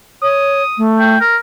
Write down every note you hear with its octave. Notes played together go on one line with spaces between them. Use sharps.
C#5 D#6
A3
G5
A#4